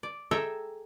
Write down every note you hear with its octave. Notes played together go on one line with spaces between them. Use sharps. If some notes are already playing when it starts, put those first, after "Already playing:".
D5
G#4 A4 E5 G5 A#5